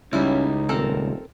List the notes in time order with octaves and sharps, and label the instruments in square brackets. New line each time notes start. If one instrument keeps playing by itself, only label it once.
[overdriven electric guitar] C#2 [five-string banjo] G3 E4 [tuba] C#4 [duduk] D#4
[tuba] D#1 [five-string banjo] C4 A4 A#4